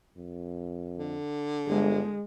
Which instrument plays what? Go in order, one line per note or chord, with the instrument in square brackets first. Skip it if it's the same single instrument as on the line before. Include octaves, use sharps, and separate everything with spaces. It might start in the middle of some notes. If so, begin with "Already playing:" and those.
[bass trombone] F2
[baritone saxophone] D3
[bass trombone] G1 [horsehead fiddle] G#3